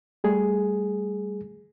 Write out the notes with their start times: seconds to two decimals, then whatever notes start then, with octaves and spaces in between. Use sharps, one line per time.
0.24 G3 A3 G#4